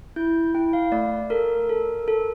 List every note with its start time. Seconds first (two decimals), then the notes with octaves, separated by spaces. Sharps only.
0.16 E4 G6
0.54 E4 G5
0.73 F5
0.92 A3 D5
1.30 A4 A#4
1.69 A4
2.08 A4